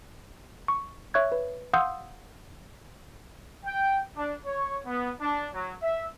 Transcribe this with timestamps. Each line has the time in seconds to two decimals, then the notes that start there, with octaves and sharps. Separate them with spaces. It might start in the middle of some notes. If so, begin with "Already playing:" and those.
0.68 C#6
1.14 C#5 E5 C#6 F#6 G#6
1.32 B4
1.73 F5 F#5 C6 D#6 E6 G6
3.65 G5
4.16 D4
4.45 C#5
4.86 B3
5.20 D4
5.53 F#3
5.82 E5